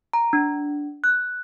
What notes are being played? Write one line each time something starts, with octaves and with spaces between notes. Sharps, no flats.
A#5
D4
F#6